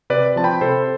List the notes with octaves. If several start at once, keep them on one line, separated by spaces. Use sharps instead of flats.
C3 B4 D5
F3 C4 A5
G5 B5
C3 A4 C5